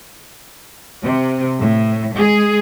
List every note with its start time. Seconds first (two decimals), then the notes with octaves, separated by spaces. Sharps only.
1.03 C3
1.59 A2
2.14 G#3 G#4